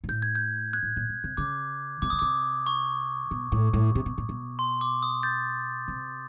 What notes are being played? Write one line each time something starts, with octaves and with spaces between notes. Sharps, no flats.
A#2
A2 G6
G#6
G6
F#6 G#6
A2
A#2
B2
C3
C#3 D6
C3 D6
C#3 D#6
C3 D6
C#6
B2
A2
A2
C3
B2
A#2
B2
C6
D6
D#6
G6 A6
C3